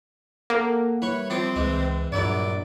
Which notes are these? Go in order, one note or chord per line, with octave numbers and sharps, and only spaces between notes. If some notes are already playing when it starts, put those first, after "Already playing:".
A#3 A4 F#5
G3 E4 B4 C#5 C#6
F3 C4 F4 D6
C#2 E3 G#3
A#1 G2 F#3 E4 D5